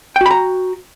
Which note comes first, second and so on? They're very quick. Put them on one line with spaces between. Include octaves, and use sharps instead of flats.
G5 F#4 B5 A#5